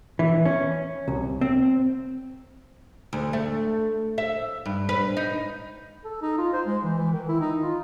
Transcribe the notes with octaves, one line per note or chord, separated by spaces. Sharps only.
E3
C#4
C2
C4
D2
A3
E5
G2
B4
D#4
A4
D#4
F4
C5
G#3
E3
E3
D#3
E4
D#4
F4